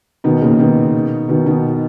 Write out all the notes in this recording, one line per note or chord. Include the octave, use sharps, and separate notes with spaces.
B2 D#3
A#2 C#3
B2 D#3
B2 D#3
B2 D#3